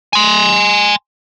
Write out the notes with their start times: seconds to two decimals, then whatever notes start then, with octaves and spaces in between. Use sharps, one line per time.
0.13 G#5 C6